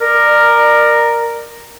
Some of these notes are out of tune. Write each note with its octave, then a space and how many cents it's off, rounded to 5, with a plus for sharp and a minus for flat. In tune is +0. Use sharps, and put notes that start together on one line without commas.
A#4 +0 D5 +25